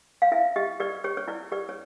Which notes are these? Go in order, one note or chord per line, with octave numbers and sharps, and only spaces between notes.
F5
E4 E5
G4 D#5
G4 D5
G4 C#5
C#5
E4 D5
G4 D5
C#5